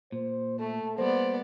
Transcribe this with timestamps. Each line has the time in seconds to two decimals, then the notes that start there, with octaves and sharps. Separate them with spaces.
0.12 A#2 C5
0.59 A3 A4
0.98 G3 A#3 B3 C5 D5